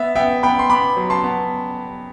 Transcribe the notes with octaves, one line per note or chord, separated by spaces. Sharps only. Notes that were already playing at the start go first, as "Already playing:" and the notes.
Already playing: B3 E5
B3 E5 G5
B3 G5 B5
C6
B3 B5 D6
F#3
A5 C6
B3